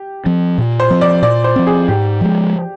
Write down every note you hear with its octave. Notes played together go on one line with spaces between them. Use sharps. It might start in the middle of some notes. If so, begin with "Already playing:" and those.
Already playing: G4
F3 C4
A#2
C5
F3 C4
D5
A#2 D5
C5
F3 C4
G#4
G#2 G4
F3 G#3